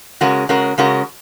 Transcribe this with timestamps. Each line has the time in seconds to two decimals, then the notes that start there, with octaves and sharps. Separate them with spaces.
0.21 C#3 G#3 C#4 F#4 A#4
0.49 C#3 G#3 C#4 F#4 A#4
0.78 C#3 G#3 C#4 F#4 A#4